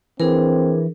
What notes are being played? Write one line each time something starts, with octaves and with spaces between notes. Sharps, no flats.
E3 C4 D4 G#4 A#4